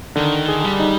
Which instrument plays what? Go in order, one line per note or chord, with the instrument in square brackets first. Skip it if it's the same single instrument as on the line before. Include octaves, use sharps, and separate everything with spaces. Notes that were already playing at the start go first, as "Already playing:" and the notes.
[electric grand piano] D3 [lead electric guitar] D#3
[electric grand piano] G#4
[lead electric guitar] G3
[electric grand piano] D#4